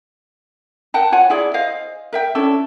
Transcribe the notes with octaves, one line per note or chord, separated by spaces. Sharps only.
A#4 F#5 G5 A5
F4 C#5 F#5 G#5
E4 G#4 D5
C5 D#5 F5 G#5
A#4 E5 G5
C#4 D4 E4 A4